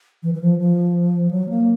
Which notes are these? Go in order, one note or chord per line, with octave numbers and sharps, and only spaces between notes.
E3
E3
F3
F3
F#3
A#3